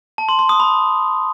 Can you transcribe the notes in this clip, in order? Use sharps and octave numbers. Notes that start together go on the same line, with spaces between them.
A5
C6
C6
D#6
B5